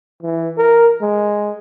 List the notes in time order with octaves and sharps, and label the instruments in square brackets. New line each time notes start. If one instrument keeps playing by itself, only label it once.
[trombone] E3
A#4
G#3